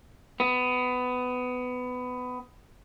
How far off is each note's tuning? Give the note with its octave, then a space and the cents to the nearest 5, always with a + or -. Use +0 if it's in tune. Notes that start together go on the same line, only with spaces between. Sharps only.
B3 +20